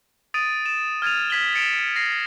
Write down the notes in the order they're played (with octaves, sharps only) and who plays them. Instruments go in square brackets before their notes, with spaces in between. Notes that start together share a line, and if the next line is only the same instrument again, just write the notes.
[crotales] D#6 A6 D7 D#7
E7
F6 G#6 A6 D#7 F7
F6 G#6 B6 F#7 G7
A6 C#7 D7 E7 F7
A#6 C7